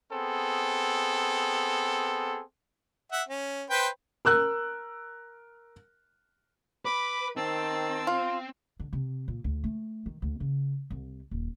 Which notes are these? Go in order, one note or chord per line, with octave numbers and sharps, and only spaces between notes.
B3 C4 G#4 A4
E5 F#5
C#4
B4 C5 G5
A#4 E6 F#6
B4 B5 D6
D#3 C4 A5 E6
F4
D3
C3
A#2
D2
A3
D#3
D2
C#3
C2
D#1